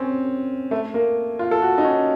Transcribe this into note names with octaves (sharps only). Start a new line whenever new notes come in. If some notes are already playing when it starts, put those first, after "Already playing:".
Already playing: C4 C#4
A3
A#3
F4
A4
F#4
D#4
C#4